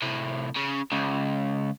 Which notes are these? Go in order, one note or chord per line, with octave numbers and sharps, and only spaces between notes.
A2 C3
C#3
C#2 C#3